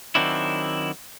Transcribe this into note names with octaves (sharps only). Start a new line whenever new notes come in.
D#3 F#3 C4 D4 E4